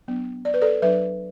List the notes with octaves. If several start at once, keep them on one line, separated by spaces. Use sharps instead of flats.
F#3 B3 D4
D5
B4
A4 D5
F#3 D4 B4 E5